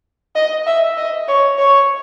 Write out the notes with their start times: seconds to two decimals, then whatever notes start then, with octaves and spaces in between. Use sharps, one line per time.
0.35 D#5
0.66 E5
0.97 D#5
1.28 C#5
1.58 C#5